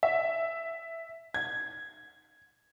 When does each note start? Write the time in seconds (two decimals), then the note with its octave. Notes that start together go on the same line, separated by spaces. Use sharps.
0.03 E5
1.34 G#6